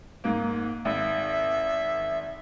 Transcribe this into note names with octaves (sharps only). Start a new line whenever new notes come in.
G#2 A#3
G#1 E5